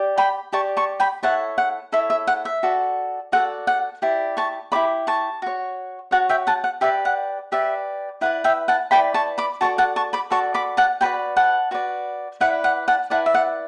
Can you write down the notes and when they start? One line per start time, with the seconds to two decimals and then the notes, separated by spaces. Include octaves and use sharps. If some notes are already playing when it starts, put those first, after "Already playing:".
Already playing: G4 D5
0.18 G5 B5
0.53 G4 D5 A5 C#6
0.77 A5 C#6
1.00 G5 B5
1.23 E4 A4 C#5 F#5 A5
1.58 F#5
1.92 E4 A4 C#5 E5
2.10 E5
2.27 F#5
2.45 E5
2.63 F#4 A4 D5
3.32 F#4 A4 D5 F#5
3.67 F#5
4.02 E4 G4 D5
4.37 A5 C#6
4.72 E4 G4 D5 B5 D6
5.07 A5 C#6
5.42 F#4 C#5
6.11 F#4 C#5 F#5 A5
6.29 E5 G5
6.47 F#5 A5
6.64 F#5
6.81 G4 B4 D5 E5
7.05 F#5
7.52 G4 B4 D5 E5
8.21 E4 B4 D5 F#5
8.44 E5 G5
8.68 F#5 A5
8.91 E4 B4 D5 G5 B5
9.14 A5 C#6
9.38 B5 D6
9.61 F#4 A4 D5 A5 C#6
9.78 F#5 A5
9.96 A5 C#6
10.13 B5 D6
10.30 F#4 A4 D5 A5 C#6
10.54 B5 D6
10.77 F#5 A5
11.01 F#4 B4 D5 G5 B5
11.37 F#5 A5
11.71 F#4 B4 D5
12.41 E4 B4 D5 F#5
12.64 F#5
12.88 F#5 A5
13.10 E4 B4 D5 F#5 A5
13.26 E5
13.34 F#5